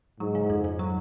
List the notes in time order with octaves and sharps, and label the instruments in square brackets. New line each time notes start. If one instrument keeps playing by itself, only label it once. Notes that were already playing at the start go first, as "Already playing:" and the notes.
[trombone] G#2 [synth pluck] F#3
[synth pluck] C#3
F2
F2
F#3